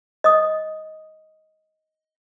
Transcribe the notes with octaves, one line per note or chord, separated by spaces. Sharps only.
D#5 D#6